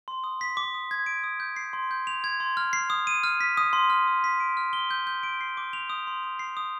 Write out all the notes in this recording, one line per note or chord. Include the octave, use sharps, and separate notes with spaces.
C6
D#6
B6
D6
D#6
G#6
D7
D#6
G6
C7
C6
G6
F7
G#6
C6
F6
C7
D#6
D#7
F6
B6
D#6
C6
F6
D#6
B6
D7
F6
G7
G6
G6
D7
C7
D6
F7
D#6
C6
D#6
C7
D#6